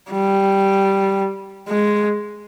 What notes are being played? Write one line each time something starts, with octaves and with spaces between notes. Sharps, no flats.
G3
G#3